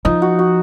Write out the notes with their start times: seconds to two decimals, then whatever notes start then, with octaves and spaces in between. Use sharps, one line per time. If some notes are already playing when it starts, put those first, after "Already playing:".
0.05 F3 D#4
0.22 F#4
0.39 F#4